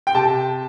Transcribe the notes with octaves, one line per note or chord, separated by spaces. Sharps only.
G5
C3 A5